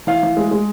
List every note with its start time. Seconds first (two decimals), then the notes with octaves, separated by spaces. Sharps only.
0.07 E3 F5
0.23 E3
0.37 G#3
0.51 G#3